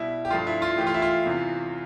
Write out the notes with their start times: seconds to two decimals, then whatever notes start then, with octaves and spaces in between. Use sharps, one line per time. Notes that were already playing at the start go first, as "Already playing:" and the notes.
Already playing: B2 G3 E4
0.25 G4
0.30 G2 F3 A3 F4
0.47 E4
0.62 F4
0.78 A2 E3 A3 G4
0.87 F4
0.94 E4
1.02 F4
1.25 E2 C3 E3